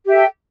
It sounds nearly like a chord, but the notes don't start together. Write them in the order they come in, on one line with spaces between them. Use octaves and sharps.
G4 E5 A4 G5